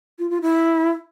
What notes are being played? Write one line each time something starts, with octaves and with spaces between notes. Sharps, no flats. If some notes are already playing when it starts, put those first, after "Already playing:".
F4
F4
E4